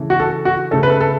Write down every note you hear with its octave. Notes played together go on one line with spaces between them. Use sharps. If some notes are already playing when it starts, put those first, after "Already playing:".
Already playing: C#3 E3 A3
F#4
A4
F#4
C#3 A3 A4
B4
A4
A4